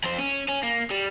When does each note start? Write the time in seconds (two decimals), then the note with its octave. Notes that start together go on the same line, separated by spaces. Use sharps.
0.04 F2 C5
0.18 C#4
0.48 C#4
0.63 A#3
0.91 G3